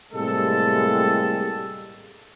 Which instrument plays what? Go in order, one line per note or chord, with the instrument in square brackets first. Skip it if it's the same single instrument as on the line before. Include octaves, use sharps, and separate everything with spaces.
[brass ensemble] A2 C3 G3 G#3 A#3 A4